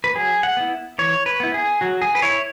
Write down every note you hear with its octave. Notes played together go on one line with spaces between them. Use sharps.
B4
F#3 G#4
F#5
B3 E4
E3 C#5
B4
B3 E4
G#4
F#3 F#4
G#4
B4
E4 C#5